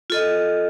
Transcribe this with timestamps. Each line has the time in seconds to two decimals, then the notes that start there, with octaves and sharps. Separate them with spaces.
0.10 F4 A4 D#5